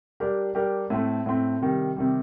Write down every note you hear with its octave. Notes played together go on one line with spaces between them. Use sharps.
G3 D4 G4 A#4
G3 D4 G4 A#4
A2 A3 C4
A2 A3 C4
C3 D#3 G3
C3 D#3 G3